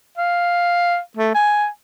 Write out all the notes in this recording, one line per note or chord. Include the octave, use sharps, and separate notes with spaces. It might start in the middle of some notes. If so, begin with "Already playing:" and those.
F5
A3
G#5